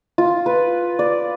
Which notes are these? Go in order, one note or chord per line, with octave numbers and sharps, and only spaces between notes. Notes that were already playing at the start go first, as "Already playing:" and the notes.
F4
B4
D5